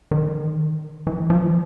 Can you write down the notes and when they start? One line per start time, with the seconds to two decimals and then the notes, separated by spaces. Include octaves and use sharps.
0.11 D#3
1.07 E3
1.30 F3